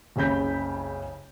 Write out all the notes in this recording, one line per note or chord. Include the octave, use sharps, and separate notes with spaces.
F#1 C2 C#3 B5 G6 B6